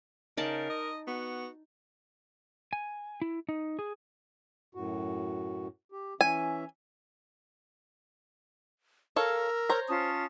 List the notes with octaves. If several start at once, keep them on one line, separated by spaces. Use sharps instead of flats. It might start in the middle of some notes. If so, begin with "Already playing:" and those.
C#3 D#4 A#4 D5 A5
D#5
B3 F#4
G#5
E4
D#4
G#4
F#2 A2 F#4
G4
E3 C#4 E5 G#5
A4 A#4 C#5 F5 E6
C5 C#5 A#5
C#4 F4 A5 D#6